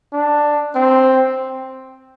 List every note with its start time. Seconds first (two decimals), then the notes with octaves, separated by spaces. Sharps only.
0.13 D4
0.75 C4